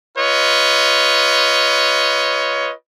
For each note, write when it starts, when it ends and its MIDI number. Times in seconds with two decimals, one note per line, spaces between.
0.18 2.73 65
0.18 2.73 71
0.18 2.73 73
0.18 2.73 75